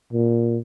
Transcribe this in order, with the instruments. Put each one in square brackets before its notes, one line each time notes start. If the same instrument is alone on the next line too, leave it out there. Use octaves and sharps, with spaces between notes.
[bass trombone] A#2